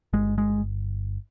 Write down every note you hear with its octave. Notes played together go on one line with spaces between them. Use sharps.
G1 G#3
G#3